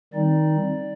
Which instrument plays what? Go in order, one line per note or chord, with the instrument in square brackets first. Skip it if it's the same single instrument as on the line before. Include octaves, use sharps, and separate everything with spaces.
[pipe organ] D#3 G3 C4 D#4 D5